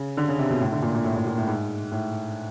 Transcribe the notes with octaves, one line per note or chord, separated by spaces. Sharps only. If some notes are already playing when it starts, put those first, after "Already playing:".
Already playing: C#3
D3
C#3
C3
B2
A2
D3
A#2
A#2
A2
A2
A#2
A2
G#2
A2